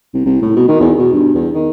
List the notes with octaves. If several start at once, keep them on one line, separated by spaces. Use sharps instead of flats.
C2
C2
A2
B2
D#3
E2
B2
G2
E2
D#3